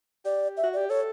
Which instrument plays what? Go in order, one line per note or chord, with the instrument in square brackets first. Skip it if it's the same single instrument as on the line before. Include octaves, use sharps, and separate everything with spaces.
[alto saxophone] G4 [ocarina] D5
[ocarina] E5
[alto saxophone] F#4
[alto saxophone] G4 [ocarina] D5
[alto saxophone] A4 [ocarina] C#5